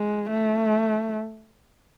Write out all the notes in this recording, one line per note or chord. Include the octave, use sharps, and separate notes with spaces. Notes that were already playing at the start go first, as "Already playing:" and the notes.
Already playing: G#3
A3